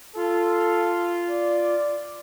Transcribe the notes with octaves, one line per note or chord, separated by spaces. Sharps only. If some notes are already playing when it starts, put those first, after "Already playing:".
F4 A4
D5